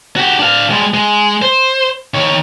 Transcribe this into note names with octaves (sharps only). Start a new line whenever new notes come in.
F#4 G4
D4 F5
G3 G#3
G#3
C5
D#3 C#5